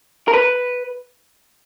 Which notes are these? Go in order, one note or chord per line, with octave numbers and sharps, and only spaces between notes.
A#4
B4